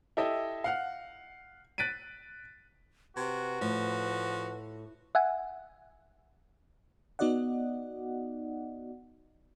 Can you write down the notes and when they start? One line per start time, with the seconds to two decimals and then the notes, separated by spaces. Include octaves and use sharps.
0.17 E4 G4 A4 D#5 E5
0.64 F5 F#5 F6
1.78 F#6 A6 B6 D7 D#7
3.16 C3 F#4 B4
3.61 A2 F3
5.15 E5 F#5 G#5
7.19 B3 D#4 F#4 D5 D#5 F#5